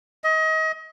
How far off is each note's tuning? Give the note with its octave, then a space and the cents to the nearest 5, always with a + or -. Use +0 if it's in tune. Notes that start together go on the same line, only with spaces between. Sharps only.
D#5 +30